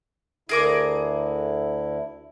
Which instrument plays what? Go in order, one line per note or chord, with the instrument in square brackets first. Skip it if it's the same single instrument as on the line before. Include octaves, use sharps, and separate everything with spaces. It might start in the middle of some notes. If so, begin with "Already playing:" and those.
[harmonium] D2 D3 E4 [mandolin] G#4 A#4 D6